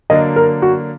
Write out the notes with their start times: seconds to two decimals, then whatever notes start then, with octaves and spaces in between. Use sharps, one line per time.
0.10 D3 F#3 A#3 D4 D#5
0.36 A#4
0.62 F#4